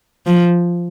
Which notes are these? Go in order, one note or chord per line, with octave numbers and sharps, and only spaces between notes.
F3